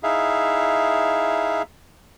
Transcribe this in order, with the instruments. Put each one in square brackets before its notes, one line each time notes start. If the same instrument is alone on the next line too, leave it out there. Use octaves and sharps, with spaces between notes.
[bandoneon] D#4 E4 G#4 E5 F5